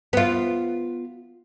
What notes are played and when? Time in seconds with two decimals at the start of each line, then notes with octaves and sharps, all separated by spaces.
0.13 B3 F4